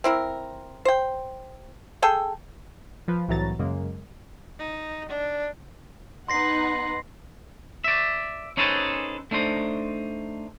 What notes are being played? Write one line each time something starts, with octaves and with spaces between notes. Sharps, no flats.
C4 E4 A#4
C5 G5
G#4 A4 G5
F3 B4
C2 A2 E3 F#3 A#5 A6
F#2 C#3 G#3 A#3
D#4
D4
B3 D#4 F#5 C6 A#6 C7
D5 E5
C#4 D#4 G#4 A4 B4 C5
A3 D4 D#4 C5